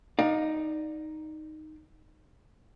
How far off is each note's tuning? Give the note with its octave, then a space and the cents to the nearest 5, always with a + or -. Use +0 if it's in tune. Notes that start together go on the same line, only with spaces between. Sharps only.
D#4 +0 D5 +20 F5 +25